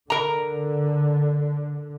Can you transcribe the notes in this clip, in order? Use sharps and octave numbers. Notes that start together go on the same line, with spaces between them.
D3 A#4 A#5